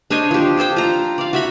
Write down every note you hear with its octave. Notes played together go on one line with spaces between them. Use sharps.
D4 C5 C#5 D#5
F3 G4
D4 A4 C5 G5
F4 A#5
D5 F5
F#4 E5 B5